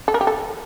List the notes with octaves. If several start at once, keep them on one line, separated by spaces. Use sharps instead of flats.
A4
A#4
G4
A4